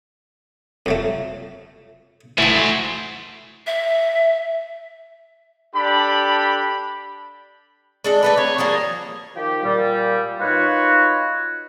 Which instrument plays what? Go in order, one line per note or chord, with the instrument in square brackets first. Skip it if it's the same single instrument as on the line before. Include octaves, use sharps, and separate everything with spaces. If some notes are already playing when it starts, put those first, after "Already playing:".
[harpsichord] F2 F#3 A3
[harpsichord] E3 A5 [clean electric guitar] A3 E4 F#4 [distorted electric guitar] C5 G#5
[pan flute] E5
[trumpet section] D4 G4 A4 B5
[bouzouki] G#3 D4 A4
[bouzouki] A3 A4 D5 [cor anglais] B4
[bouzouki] C4 [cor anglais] C#5
[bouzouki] F3 G3 A#3 [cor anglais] G#4
[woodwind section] D#3 F3 G4
A#2 G3
D#4 F4 F#4 B4 C#5